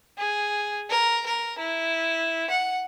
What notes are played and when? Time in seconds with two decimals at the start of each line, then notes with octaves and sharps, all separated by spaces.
0.18 G#4
0.90 A#4
1.26 A#4
1.58 E4
2.50 F#5